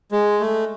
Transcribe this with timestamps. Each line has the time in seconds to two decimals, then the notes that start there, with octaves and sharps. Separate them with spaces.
0.12 G#3
0.40 A3